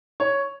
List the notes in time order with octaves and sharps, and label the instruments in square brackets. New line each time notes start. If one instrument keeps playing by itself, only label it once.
[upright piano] C#5